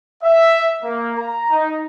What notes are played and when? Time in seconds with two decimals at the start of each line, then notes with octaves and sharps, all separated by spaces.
0.23 E5
0.83 A#3
1.17 A#5
1.50 D#4